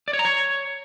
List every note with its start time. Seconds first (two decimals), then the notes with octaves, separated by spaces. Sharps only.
0.08 D5
0.13 C#5
0.19 A#5
0.25 C#5